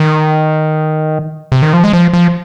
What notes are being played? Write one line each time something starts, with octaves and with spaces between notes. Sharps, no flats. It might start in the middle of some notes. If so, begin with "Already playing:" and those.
Already playing: D#3
C3
D#3
F3
G#3
F3
F3